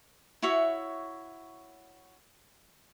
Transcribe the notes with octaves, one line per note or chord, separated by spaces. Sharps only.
E4 F#4 C#5 E5